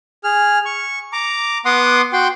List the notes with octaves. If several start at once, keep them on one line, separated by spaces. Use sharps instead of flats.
G#4 F6
C#6
A#5 D6
B3 F#5 C6 D6 D#6
F#4 G5 C6